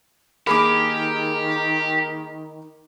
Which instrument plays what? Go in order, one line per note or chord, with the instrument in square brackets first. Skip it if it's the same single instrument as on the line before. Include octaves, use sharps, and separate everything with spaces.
[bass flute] D#3 [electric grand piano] A#3 G#4 A#4 [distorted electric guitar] G4 [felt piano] B5 D6